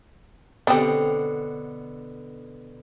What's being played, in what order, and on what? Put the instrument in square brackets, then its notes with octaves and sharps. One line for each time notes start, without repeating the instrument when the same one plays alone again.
[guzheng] B2 D3 [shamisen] B3 C4 G4